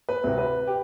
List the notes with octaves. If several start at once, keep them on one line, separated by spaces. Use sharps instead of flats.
B4
D2 C3
B4
G4